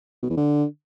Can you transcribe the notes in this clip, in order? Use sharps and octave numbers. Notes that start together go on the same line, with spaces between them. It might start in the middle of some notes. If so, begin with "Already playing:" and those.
B2
E2
D3